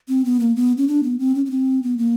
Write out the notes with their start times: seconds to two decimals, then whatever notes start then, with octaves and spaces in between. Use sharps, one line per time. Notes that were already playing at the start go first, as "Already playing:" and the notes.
0.09 C4
0.25 B3
0.40 A#3
0.56 B3
0.77 C#4
0.88 D4
1.03 B3
1.19 C4
1.35 C#4
1.46 C#4
1.51 C4
1.83 B3
1.98 A#3